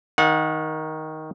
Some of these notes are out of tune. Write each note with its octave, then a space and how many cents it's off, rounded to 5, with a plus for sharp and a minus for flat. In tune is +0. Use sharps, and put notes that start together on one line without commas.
D#3 +10 F#5 -30